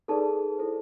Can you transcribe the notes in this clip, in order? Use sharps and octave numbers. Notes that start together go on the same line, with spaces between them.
D#4 G#4 A4 B4 D5 A5
E4 A4 C5